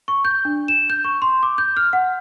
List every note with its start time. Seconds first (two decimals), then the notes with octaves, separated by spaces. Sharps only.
0.08 C#6
0.25 G6
0.45 D4
0.68 E7
0.90 G6
1.05 C#6
1.22 C6
1.43 D6
1.58 G6
1.77 F6
1.93 F#5